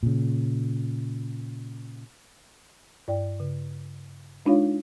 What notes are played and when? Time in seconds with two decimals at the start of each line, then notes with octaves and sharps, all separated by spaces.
0.03 A#2 C#3
3.08 G2 D5 G5
3.40 C#3
4.46 G#3 D4 D#4 F4 C#5 F5